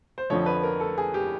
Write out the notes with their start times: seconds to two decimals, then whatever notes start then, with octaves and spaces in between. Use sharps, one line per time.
0.18 C5
0.30 F2 D3 F3 C#5
0.46 B4
0.64 A#4
0.80 A4
0.98 G#4
1.14 G4